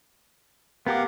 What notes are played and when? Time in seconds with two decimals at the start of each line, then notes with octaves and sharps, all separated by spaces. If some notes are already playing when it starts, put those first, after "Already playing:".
0.87 B3 G4 A#4 F5 F#5 D6